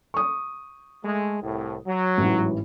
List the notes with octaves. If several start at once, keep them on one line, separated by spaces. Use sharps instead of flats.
C#6 D#6
G#3 A3
C2 A2
F#3
A1 G#2 E3